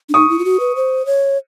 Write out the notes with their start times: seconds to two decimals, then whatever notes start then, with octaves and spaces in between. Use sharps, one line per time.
0.09 D4
0.14 D#4 C#6 D#6
0.29 E4
0.39 F4
0.45 F#4
0.60 B4
0.76 C5
1.06 C#5